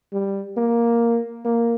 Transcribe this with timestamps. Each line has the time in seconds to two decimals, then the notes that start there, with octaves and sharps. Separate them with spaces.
0.12 G3
0.57 A#3
1.45 A#3